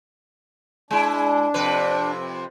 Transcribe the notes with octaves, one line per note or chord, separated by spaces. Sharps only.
G#3 D4 E4
F2 C3 B4